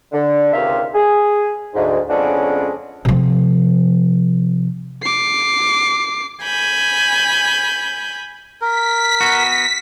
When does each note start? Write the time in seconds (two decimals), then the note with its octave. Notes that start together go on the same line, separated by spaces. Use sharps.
0.12 D3
0.53 C#2 C3 D#3 G4 E5 F5
0.94 G#4
1.75 D2 G#2
2.09 F2 C#3 G#3 B3 C#4 D4
3.05 C3 F3
5.03 D6 C7
6.43 G#5 B5 G6
8.61 A#4 B6
9.21 B3 F#4